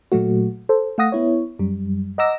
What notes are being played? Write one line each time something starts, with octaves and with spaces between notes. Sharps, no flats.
A#2 F#3 A3 F#4
A4 C5
A3 F5 F#5 D#6 A#6
B3 E4 C#5
F#2 G3
D#5 F#5 A#5 D6 E6 A#6